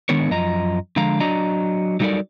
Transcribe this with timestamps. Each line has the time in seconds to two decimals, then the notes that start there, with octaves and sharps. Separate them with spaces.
0.09 D#3 G#3 B3 D4 A#4 C#5
0.30 F#2 F3 D#5 A#5
0.96 D3 F3 G#3 F5 A#5
1.20 F#3 D4 D5 D#5 A#5
2.00 F#3 G3 D#4 A4 A#4 D5